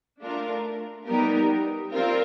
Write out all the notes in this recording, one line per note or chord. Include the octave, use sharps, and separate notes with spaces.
A3 D4 F4 A#4
G3 B3 D#4 G4 A#4
G3 C4 F4 A#4